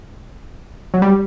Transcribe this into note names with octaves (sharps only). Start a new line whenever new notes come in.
F#3
G3